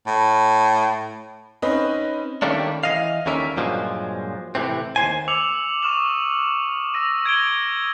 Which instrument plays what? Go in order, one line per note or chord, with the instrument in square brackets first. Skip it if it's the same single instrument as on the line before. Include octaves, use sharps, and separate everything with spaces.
[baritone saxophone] A2
[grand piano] C4 C#4 D#4 B4 D#5 B5
[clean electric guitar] D#3 G3 A3 A#3 C#4 D4
E3 D#5 F5
D#2 D3 G3 C#4 A#4 E5
G2 A#2 F3 F#3 G#3
A2 C3 E3 C4
D#2 F3 C5 G#5
[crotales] D6 E6 C#7 F7 F#7
C#6 D#6 F6 E7 F#7
D#6 E6 A#6 D#7
G#6 A#6 D7 D#7 G7